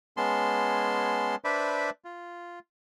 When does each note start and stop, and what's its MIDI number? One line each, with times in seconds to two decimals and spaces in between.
0.17 1.35 56
0.17 1.35 59
0.17 1.35 61
0.17 1.35 81
0.17 1.35 84
1.44 1.90 62
1.44 1.90 71
1.44 1.90 72
1.44 1.90 74
1.44 1.90 76
1.44 1.90 83
2.04 2.59 65